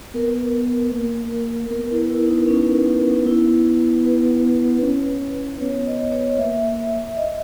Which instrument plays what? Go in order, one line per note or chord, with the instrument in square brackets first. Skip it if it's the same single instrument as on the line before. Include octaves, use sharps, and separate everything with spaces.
[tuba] B3 [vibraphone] A#4
[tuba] A#3
[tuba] B3 [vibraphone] A#4
[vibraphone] E4
E4
D#4
C#4
[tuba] B3 [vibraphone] E4
[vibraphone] B4
[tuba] C#4
[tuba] B3 [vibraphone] C#5
[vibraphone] D#5
C#5
[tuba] A#3 [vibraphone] E5
[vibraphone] D#5